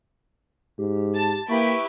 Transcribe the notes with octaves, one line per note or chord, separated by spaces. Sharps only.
G#2 G4
A5
A#3 E4 G4 B4 C#6